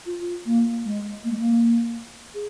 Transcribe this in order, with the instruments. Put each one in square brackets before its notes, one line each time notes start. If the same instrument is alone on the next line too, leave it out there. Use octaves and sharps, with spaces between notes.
[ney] F4
A#3
G#3
A#3
G#3
A#3
G#4